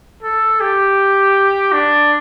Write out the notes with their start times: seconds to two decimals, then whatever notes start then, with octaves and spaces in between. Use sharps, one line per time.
0.23 A4
0.60 G4
1.72 D4